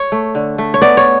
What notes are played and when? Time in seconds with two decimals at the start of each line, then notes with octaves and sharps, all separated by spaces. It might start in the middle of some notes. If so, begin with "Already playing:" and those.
Already playing: C#5
0.12 A3
0.35 D3
0.58 A3
0.74 C#5
0.82 B3 D5
0.97 C#5